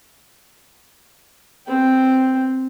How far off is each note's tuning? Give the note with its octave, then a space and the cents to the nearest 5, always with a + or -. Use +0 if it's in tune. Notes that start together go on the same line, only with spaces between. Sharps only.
C4 +0 G5 +0